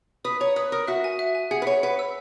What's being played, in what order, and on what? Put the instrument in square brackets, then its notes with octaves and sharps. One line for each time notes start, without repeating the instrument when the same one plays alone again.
[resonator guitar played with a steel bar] B4 [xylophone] D#6
[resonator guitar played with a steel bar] C#5 [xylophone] A#5
[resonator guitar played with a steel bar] B4 [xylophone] D#6
[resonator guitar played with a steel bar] A#4 [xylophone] D#6
[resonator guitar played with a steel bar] F#4 [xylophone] E5
[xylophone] G#5
E5
G#5
[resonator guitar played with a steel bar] G#4 [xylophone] F#5
[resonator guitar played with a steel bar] B4
[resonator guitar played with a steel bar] C#5 [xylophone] F#5
[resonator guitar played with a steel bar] B4 [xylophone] F#5
[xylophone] E6